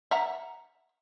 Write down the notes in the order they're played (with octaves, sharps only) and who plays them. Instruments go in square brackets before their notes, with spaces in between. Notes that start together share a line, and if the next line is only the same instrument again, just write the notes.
[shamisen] E5 F#5 A#5